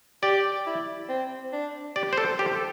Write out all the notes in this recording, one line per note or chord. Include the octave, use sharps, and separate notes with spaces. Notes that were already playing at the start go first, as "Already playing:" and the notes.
G4 D5
E4
C4
D4
G4 D5
C5
A4
C5
G4
A4